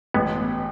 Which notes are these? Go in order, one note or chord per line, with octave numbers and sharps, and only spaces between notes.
A1 G#3 B3